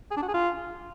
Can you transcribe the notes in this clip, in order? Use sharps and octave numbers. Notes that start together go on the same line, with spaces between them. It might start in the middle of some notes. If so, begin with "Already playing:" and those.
G#4
D4
F#4
G#4
F4